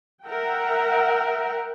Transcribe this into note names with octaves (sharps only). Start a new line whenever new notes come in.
A#4 E5 F#5 G5